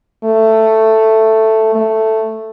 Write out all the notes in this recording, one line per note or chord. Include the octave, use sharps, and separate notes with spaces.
A3
A3